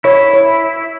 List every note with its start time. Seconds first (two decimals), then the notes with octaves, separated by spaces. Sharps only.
0.04 E4 C#5
0.34 C#5